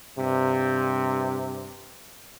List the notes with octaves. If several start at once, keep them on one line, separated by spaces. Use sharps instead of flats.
G2 C3